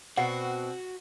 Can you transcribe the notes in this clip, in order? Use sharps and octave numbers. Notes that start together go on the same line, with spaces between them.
B2 C4 F#4 F#5